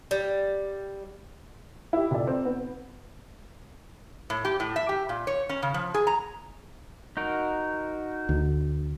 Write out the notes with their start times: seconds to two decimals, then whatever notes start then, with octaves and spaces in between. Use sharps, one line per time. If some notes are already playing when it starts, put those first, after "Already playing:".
0.11 G3
1.93 E4 G4
2.11 F1 D5
2.27 C4
2.45 B3
4.30 A2
4.45 G4
4.60 A2
4.76 E5
4.89 G4
5.09 A#2
5.27 C#5
5.49 C#4
5.62 C#3
5.74 F3
5.94 G#4
6.07 A#5
7.17 D#4 F#4 A#4
8.29 D2